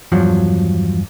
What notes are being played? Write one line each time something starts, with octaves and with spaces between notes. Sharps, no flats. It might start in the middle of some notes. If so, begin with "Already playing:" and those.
E2 G2 F3 F#3